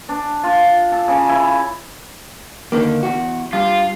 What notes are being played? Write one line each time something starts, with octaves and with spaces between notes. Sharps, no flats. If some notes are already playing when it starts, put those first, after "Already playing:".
D4
F4
A4
C#3
E4
D3 D#3 A#3
E2 F#4
G2 F4